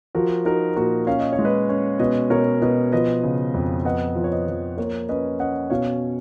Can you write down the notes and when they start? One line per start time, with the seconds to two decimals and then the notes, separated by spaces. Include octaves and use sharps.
0.15 F3 F#4 A#4
0.45 D#4 F#4 A#4
0.76 A#2 F#4 A#4
1.07 C#4 F5
1.19 D#5
1.33 C#5
1.39 G#3
1.45 B4 D#5
1.69 C#4
1.99 B2 B4 D#5
2.30 B2 A#4 C#5
2.62 B2 B4 D#5
2.92 F3 B4 D#5
3.23 C#3
3.54 F2
3.85 B3 D#5 F#5
4.16 F3
4.24 C#5
4.31 B4 D#5
4.47 F3
4.77 A#3 A#4 C#5
5.09 C#4 B4 D#5
5.39 C#4 D#5 F#5
5.70 B2 C#5 F5